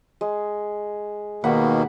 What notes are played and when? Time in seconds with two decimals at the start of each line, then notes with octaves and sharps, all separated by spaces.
0.21 G#3
1.44 D#2 B2 D#3 A#3 F#5 B5